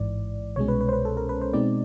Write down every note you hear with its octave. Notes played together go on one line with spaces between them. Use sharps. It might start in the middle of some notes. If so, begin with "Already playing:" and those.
Already playing: A1 G#2 E3 D5
C2 B2 G#3 C#4 C#5
B4
B4
C5
B4
A4
A#4
B4
C5
B2 G#3 C4 D#4 D5